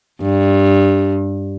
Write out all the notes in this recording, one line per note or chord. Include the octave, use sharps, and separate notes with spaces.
G2